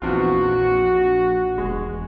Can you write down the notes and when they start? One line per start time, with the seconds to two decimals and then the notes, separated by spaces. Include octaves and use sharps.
0.02 A#1 E2 C4 F4 F#4
1.58 E1 G#3